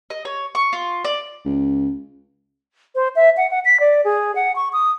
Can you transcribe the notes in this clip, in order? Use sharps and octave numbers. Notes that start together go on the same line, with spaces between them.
D#5
C#5
C#6
F4
D5
C#2
C5
E5
F#5
F#5
B6
D5
G#4
F#5
C#6
D#6